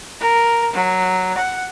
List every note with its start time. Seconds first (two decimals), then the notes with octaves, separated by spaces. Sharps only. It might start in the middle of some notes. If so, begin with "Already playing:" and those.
0.20 A#4
0.74 F#3
1.38 F#5